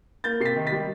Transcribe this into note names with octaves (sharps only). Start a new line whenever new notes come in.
A#3 G6 A6
C3 C7
A6 B6
D#3
A6 B6
G3